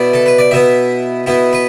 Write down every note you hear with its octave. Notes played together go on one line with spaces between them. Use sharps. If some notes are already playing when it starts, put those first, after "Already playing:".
Already playing: B2 B3 E4 D5
A4
B4
D5
B2 B3 E4 E5
B2 B3 E4
B4